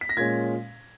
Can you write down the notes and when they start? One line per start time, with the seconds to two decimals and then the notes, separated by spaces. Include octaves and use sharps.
0.01 B6
0.09 A#6
0.17 A#2 G#3 C#4 G#6